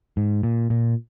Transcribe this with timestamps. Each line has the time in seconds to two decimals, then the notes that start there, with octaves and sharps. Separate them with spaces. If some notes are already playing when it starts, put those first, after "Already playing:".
0.17 G#2
0.43 A#2
0.70 A#2